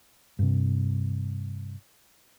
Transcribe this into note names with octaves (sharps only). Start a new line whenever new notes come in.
G2 C3